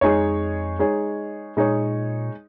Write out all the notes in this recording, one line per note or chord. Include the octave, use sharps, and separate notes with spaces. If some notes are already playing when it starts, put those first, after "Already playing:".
F2 G#3 D#4 G#4 C#5
G#3 D#4 G#4 C#5
A#2 G#3 D#4 G#4 C#5